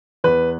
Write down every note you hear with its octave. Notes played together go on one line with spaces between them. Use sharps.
E2 B4